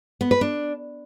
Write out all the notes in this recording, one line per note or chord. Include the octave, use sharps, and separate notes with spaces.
B3
B4
D4